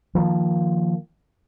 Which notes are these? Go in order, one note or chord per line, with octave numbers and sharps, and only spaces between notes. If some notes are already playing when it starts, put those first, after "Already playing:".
D#3 F3 A#3